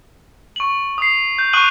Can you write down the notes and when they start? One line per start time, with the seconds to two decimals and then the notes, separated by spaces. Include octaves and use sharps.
0.56 C#6 F#7
0.98 D#6 C7
1.38 G6
1.53 C#6 D#6 F#6 D#7 F#7